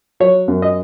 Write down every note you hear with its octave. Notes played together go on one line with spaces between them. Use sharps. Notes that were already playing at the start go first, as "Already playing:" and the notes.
F#3 C#5
F#2
D#5